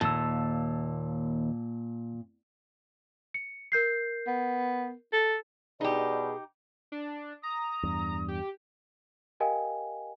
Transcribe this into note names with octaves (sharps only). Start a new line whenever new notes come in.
D#2 A#2 A5 E6
C#7
A#4 G6 C7
B3
A4
B2 D#4 G4 G#4 D5
D4
A#5 D#6
E2 G2
G4
G4 A#4 D#5 F5 G5 G#5